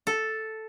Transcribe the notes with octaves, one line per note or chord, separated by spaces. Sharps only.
A4